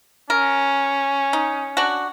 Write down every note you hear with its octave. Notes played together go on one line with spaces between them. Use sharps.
C#4 A#4
D#4
D4 F#4